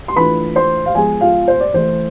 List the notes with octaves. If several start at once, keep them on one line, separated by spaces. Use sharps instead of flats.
C6
E3 A3 D4 F4 B4 B5
C5 C6
F5
F3 G#3 B3 G#4 G#5
F4 F5
C5
D5
E3 A3 E4 C5